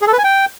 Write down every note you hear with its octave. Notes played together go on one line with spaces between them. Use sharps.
G#4
A4
B4
G#5
G5